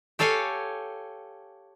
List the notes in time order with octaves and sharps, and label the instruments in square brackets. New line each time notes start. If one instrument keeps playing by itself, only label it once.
[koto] G4 A4 C#5 F5 G#5